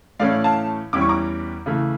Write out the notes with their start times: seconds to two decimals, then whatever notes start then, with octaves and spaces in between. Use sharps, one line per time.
0.20 A2 E3 A3 C#4 D5 F5
0.44 F5 A5
0.93 E2 E3 G3 C#4 D6
1.01 C#6
1.09 A#5 D6
1.66 C#3 E3 A3